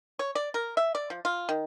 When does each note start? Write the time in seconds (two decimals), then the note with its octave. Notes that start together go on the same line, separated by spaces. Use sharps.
0.19 C#5
0.35 D5
0.54 A#4
0.77 E5
0.95 D5
1.10 F3
1.25 F4
1.49 D#3